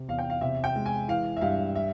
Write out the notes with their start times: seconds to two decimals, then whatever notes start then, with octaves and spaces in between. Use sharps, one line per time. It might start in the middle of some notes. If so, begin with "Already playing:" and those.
Already playing: C3
0.08 E2 F5
0.19 G5
0.30 F5
0.41 C3 E5
0.64 G5
0.75 G#3
0.86 G#5
1.08 E3 F5
1.37 E5
1.41 G2 F5
1.76 E5